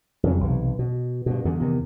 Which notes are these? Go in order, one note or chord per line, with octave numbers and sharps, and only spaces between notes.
F2 C#3 F#3
B1 C3 E3
B2
G2 B2
E2 G2 D3
E2 C3 D#3